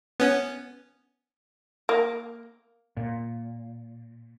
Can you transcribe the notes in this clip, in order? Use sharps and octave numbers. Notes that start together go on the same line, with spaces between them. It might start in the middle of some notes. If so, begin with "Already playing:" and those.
B3 C#4
A#3
A#2